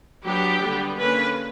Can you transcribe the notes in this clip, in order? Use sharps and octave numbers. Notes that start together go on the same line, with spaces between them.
F#3 B3 D4 G4
D3 G3 B3
D3 A#3 C#4 B4